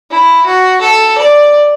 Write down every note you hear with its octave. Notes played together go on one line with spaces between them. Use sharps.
E4
F#4
A4
D5